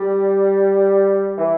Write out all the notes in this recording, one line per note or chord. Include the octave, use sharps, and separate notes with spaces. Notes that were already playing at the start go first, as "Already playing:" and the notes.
Already playing: G3
E3